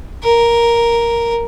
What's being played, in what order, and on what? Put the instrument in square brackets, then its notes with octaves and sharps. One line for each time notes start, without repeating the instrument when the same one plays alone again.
[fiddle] A#4